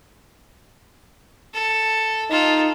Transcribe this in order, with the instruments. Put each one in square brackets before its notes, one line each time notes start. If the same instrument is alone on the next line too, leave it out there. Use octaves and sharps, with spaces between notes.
[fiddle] A4
[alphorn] D#4 [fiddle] F4 A4